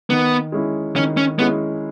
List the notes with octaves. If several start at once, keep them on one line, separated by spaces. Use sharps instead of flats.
D#3 B3
G#3 C#4 E4
D#3 C#4
C#4
G#3 B3 C#4 E4